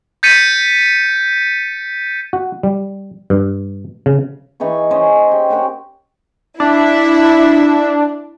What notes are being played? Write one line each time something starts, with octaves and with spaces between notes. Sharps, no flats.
G6 A6 B6 C#7 D#7
F#4
G3
G2
C#3
E3 D#4 G#4 C#6
C#4 C5 D#5
G4
F#4 G4 A#4 D#5
D4 E4 E5